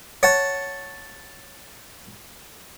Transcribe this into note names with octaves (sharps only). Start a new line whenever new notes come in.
C#5 F#5 A5